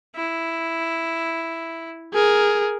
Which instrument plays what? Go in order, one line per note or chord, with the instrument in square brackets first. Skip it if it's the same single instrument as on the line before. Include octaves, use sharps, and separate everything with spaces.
[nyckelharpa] E4
[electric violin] G#4 [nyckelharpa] A#4